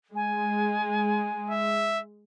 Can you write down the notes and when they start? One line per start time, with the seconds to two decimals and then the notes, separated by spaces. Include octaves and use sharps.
0.15 G#3 G#5
1.50 E5